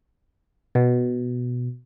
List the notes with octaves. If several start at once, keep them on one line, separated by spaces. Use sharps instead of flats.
B2